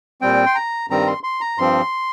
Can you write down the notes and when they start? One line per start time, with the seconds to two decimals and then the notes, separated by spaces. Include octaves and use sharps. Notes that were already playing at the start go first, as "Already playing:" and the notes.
0.21 A#2 G3 C4 G5
0.46 C6
0.55 A#5
0.90 G2 D#3 G3 C4 A#5
1.07 C6
1.23 C6
1.41 A#5
1.58 G2 F3 C4 C6